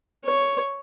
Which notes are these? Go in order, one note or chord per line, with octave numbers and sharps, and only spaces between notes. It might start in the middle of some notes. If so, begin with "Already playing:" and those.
C#5